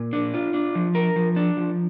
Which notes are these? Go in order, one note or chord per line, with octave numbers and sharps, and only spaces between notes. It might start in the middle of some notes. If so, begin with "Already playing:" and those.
Already playing: A#2
D4
F4
D4
F3
A#4
F3
D4
F3